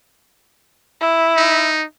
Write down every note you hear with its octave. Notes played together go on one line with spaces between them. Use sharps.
E4
D#4